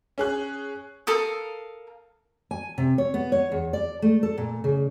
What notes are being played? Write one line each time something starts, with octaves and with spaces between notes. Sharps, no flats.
C#4 G#4 F#6
A4 A#4 F5 D#6
G#5
C3
C#5
B3
C#5
E2
D5
A3
A4
A#2
C#3